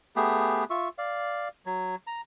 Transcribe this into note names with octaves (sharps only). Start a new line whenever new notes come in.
A3 B3 G4 G#4
F4 E5 C#6
D5 F5
F#3
A#5